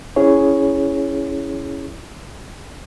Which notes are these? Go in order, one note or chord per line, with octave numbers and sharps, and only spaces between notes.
C#4 E4 G#4 C#5